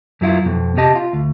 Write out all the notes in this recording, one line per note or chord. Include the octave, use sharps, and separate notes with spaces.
F#2 F#3 E4 F4
F2 B2
C3 G4 D#5 A5
F4
D2